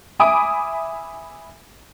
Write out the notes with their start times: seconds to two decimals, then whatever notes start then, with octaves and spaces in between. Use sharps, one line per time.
0.19 E5 G#5 B5 D6 D#6 D7